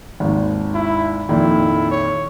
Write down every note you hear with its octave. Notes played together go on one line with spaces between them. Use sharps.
G#1 D#2
E4
F2 A#2 D#3 E4
C#5